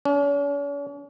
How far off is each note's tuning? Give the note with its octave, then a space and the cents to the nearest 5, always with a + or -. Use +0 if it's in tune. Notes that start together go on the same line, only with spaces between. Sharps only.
C#4 +45